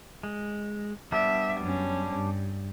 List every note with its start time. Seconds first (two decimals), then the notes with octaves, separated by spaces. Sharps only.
0.23 G#3
1.12 G3 B3 D4 E5
1.60 F#2 C#4
2.15 G2